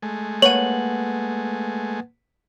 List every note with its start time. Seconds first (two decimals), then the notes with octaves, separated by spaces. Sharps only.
0.02 G#3 A3
0.42 A#3 B4 C#5 F#5 D#7 F#7